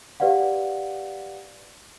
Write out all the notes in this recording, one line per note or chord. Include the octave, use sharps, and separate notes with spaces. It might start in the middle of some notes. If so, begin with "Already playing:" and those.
G4 B4 D5 F5 F#5